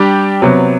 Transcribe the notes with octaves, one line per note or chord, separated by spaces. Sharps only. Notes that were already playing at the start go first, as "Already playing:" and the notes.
Already playing: G3 D4 G4
C3 F#3 B3